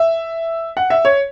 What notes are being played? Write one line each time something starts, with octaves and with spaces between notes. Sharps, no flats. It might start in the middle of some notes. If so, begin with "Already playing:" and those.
Already playing: E5
F#5
E5
C#5